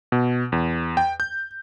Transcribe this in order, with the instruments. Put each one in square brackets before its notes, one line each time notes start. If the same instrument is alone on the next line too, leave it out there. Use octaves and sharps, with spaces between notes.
[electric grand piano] B2
E2
G5
G6